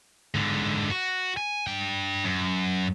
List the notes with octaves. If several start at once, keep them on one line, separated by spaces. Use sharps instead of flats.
G#2 D3
F#4
G#5
D4 G5
F#2